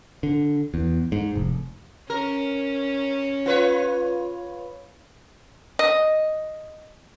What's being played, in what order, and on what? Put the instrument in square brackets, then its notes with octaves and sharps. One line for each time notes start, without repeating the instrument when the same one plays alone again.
[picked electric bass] D3
E2
G#2
F1
[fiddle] C#4 [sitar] A#4
[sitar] F4 B4 C#5
[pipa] D#5